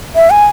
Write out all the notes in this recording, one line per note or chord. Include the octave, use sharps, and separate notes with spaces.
E5
G#5